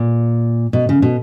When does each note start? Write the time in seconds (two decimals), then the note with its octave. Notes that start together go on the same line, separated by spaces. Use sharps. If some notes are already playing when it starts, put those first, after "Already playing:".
Already playing: A#2
0.73 B2
0.89 C#3
1.02 B2